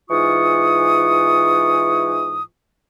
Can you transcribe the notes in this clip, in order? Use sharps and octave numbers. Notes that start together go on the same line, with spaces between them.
G#2 E3 F4 C#6 D#6